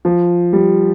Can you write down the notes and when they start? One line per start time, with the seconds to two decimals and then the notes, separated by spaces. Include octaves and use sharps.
0.05 F3
0.53 G3